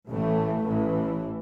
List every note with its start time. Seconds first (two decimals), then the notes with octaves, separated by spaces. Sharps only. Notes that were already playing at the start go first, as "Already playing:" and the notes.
0.09 A1 A2 E3 A3
0.66 A1 A2 E3